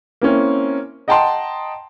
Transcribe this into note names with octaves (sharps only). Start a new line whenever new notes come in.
A#3 C4 C#4 E4
D#5 F#5 G5 A5 A#5 C6